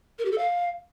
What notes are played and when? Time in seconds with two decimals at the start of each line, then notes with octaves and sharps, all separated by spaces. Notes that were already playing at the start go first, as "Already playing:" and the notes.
0.19 A#4
0.25 G4
0.32 A4
0.38 F5